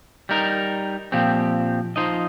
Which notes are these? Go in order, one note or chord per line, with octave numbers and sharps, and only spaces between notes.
G3 D#4 A#4
A#2 F3 C4 G4
F3 D#4 C5 D#5